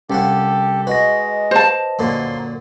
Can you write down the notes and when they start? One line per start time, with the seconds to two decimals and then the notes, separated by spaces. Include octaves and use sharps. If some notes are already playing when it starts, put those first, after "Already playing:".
0.10 C2 C#4 G4 A4 F5 F#5
0.87 G#3 F#4 B4 D#5 A#6
1.51 C5 A5
1.99 F#2 A#2 D3 A#3 C6